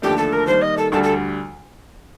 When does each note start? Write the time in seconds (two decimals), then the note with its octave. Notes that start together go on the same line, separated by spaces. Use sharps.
0.02 D#2 D3 F3 A3 D4 G4
0.17 A4
0.32 A#4
0.47 D#3 G3 A#3 C5
0.61 D#5
0.77 A4
0.92 D2 D3 G3 A4
1.03 A4